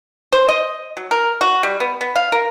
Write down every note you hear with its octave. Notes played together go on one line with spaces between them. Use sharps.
C5
D#5
F#3
A#4
F#4
G3
B3
B3
F5
A#4